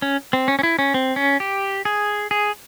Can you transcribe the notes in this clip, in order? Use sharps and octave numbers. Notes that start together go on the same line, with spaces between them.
C#4
C4
C#4
C#4
E4
C#4
C4
C#4
G4
G#4
G#4